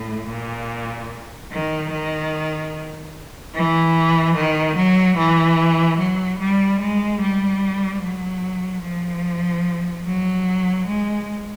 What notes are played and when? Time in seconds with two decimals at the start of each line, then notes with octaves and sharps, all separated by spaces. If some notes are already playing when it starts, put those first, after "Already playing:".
Already playing: A2
0.29 A#2
1.52 D#3
1.91 D#3
3.55 E3
4.36 D#3
4.76 F#3
5.18 E3
5.98 F#3
6.40 G3
6.80 G#3
7.21 G3
8.02 F#3
8.84 F3
10.06 F#3
10.87 G#3